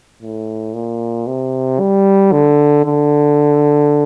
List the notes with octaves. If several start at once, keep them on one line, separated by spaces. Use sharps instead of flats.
A2
A#2
C3
G3
D3
D3